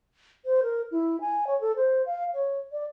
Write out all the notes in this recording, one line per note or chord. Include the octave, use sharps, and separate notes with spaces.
C5
A#4
E4
G#5
C#5
A4
C5
F5
C#5
D5